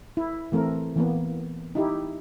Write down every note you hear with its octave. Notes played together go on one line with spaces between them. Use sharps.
E4
E3 A3 C4 A#4
E3 A#3 B3
D#4 E4 G4